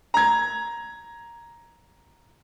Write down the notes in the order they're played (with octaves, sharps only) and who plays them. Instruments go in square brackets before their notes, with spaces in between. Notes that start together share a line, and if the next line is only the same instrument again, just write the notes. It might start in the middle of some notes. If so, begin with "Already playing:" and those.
[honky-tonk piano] A#5 G#6